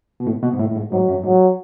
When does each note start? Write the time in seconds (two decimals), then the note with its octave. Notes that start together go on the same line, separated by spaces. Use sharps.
0.20 B2
0.27 A2
0.43 B2
0.53 G#2
0.60 A2
0.71 A2
0.76 G#2
0.92 G#2 F#3
1.09 F#2
1.24 G#2 F#3